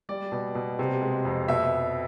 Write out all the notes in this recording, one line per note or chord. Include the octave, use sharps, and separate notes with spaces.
G3 D5
B2
B2
C3
G#3
F2
B2 E5